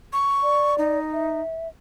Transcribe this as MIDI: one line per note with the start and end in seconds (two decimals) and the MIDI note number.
0.13 0.75 85
0.43 0.99 74
0.78 1.41 63
1.13 1.68 76